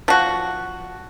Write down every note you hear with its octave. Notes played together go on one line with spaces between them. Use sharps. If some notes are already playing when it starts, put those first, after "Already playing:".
F3 F#4